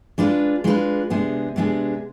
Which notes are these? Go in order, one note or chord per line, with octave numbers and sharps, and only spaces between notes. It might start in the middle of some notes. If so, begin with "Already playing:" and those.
G#3 D4 F4 B4
G#3 D4 F4 B4
C3 G#3 B3 D4 G#4
C3 G#3 B3 D4 G#4